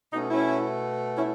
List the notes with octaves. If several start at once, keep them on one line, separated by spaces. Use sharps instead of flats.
B2 A3 C#4 D#4
C#4 E4
C#4 E4